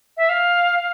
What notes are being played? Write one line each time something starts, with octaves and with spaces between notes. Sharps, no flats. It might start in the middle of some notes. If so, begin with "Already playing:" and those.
E5
F5